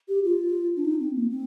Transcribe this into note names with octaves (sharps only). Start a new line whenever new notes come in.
G4
F4
D4
D#4
C4
A#3
C4